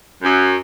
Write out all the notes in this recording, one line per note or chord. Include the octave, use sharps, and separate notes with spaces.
F#2